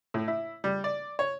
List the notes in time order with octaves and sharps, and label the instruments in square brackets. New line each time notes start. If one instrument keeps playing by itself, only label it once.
[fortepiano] A2
E4
G3
D5
C#5